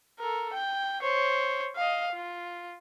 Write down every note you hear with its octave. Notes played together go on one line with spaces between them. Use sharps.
A4 A#4
G5
C5 C#5
D#5 F5
F4